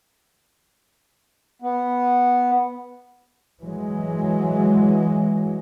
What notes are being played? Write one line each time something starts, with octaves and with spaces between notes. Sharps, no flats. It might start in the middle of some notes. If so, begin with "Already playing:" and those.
B3
E3 F#3 G#3